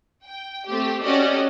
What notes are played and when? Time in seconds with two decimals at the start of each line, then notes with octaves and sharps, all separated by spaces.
0.24 G5
0.69 A3 C4 G4
1.02 C#4 F#4 G4 A4 D5 D#5